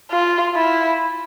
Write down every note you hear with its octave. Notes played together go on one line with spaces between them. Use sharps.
F4
E4